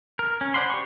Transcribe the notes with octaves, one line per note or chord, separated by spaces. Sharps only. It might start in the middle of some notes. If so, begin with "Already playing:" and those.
A#4
C#4
C5 D5 F#5 B5 C6
G4 C#5 C#6